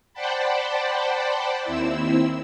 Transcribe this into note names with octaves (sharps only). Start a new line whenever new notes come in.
C5 D5 F#5 G5 A5 B5
D#2 C4 E4 E6